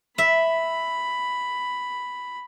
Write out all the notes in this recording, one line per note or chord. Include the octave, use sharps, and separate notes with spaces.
E5 B5